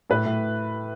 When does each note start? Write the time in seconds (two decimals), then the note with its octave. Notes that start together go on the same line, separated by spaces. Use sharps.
0.10 A2 B4
0.25 A2